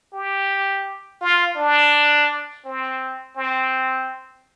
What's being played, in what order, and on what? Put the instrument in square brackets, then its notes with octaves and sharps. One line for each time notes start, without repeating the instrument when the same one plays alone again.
[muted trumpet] G4
F4
D4
C4
C4